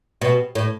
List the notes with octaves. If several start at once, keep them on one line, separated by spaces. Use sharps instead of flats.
B2
A2